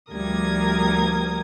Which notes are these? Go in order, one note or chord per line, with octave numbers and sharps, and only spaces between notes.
D2 F3 G3 A#4 D#6 G#6